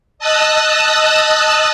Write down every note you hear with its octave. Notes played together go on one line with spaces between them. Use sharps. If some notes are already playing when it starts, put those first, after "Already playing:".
D#5 A5 D#6 E6 F#6